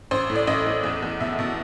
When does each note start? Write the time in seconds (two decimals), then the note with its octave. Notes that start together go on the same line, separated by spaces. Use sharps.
0.11 A1 C5
0.30 A2
0.36 D5
0.47 A1 D#5
0.66 A2
0.84 E2
1.02 E2
1.20 B2 E5
1.39 B2